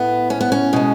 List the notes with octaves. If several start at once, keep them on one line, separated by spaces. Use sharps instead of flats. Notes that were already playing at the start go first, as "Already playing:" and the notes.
Already playing: A2 B3
C#4
B3
C#4
B2 G#3